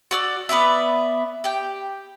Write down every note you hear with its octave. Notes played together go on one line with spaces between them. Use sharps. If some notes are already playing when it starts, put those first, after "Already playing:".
F#4 D5 E6
B3 B4 D5 E5
G4 G5